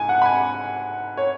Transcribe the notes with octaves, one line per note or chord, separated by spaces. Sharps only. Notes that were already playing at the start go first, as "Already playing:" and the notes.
Already playing: G#2 G#5
F#5
B5
G#5
C#5